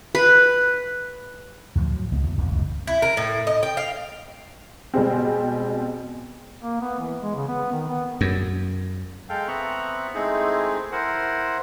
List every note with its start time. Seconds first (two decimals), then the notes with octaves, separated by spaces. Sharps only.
0.15 B4
1.75 D2 A2 F3 F#3
1.89 F#3
2.11 C#2 G#3 B3
2.23 E2
2.38 D1 C2 F2 D3
2.51 C#2 F#2
2.87 E4
3.02 A#4
3.17 A2
3.47 D#5
3.63 G5
3.77 F5
4.94 B2 G3 G#3 C4
6.61 A#3
6.81 B3
6.99 E3
7.22 G#3
7.36 C#3
7.48 B3
7.72 D#3
7.89 B3
8.21 F#2
9.29 G#3 A4 F5 G5
9.48 B3 C4 E5 A#5 C#6 F#6
10.14 G#3 A3 C4 D#4 E4 G#4
10.92 E4 A#4 C5 F#5